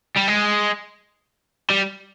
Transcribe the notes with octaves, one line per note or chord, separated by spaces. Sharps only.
G3
G#3
G3